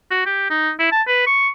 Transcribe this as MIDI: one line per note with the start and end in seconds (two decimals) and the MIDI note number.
0.11 0.23 66
0.26 0.45 67
0.50 0.71 63
0.79 0.90 64
0.92 1.02 81
1.07 1.22 71
1.26 1.48 85